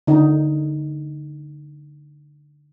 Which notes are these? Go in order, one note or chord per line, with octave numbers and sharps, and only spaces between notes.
D3 D#4